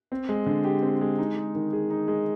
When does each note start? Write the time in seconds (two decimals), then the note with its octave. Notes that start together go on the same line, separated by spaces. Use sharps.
0.12 C4
0.29 G#3
0.46 D3
0.64 G4
0.82 C4
1.01 G#3
1.18 D#4
1.36 G#3
1.55 D#3
1.73 G#4
1.90 D#4
2.08 G#3